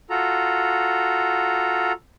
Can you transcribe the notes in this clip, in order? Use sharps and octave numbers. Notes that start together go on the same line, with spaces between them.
F4 F#4 A4 A#5